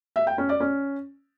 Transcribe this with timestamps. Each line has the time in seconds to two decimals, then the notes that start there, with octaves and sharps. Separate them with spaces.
0.16 E5
0.27 G5
0.38 C#4
0.49 D5
0.60 C#4